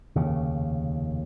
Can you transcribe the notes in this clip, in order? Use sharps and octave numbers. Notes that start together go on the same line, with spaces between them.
F1 D#2 C#3